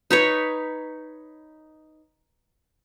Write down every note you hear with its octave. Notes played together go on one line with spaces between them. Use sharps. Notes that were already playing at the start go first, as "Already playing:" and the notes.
D#4 B4 C#5